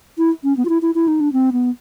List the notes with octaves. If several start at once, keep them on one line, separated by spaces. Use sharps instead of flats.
E4
C#4
B3
F4
E4
E4
E4
D#4
D4
C4
B3